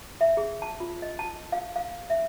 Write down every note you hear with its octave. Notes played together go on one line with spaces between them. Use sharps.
E5
G#4
A5
F4
D#5
A5
F5
F5
E5